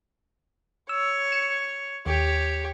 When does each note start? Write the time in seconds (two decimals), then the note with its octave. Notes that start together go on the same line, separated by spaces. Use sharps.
0.89 C#5 E6
1.32 C#7 E7
2.06 D#2 G4 C#5